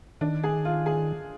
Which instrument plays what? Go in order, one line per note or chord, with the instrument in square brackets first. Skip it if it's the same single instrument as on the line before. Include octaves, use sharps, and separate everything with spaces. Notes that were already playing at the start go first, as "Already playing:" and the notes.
[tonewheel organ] D#3 [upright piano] D4
[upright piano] G#4
F4
G#4